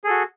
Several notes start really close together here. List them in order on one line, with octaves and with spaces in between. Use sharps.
G#4 A4 F#4